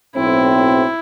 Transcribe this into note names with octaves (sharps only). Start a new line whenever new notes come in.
B1 A2 F#3 C4 E4